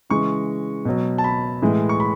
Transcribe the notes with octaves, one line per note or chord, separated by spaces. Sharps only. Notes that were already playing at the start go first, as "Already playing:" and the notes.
C#3 E3 G#3 C#6
B2 F#3
A5
B5
A2 E3 G#3
C#6
B5